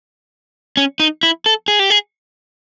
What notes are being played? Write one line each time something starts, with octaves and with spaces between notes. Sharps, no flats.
C#4
D#4
E4
A4
G#4
G4
G#4